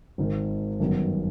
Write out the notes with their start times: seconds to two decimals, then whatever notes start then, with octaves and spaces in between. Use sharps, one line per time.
0.18 G#1 G#2 D#3
0.79 G1 F#2 D#3 F#3 B3